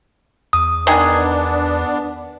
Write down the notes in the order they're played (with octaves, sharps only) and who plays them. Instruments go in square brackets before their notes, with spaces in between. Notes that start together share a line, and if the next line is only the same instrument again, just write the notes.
[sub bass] E2 [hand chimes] D#6
[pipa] D#3 G#4 [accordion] B3 D4